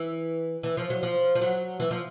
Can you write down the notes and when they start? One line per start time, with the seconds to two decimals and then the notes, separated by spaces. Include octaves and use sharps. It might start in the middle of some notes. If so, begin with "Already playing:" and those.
Already playing: E3
0.63 E3
0.77 F3
0.90 F#3
1.03 F3
1.35 F3
1.41 F#3
1.80 E3
1.91 F3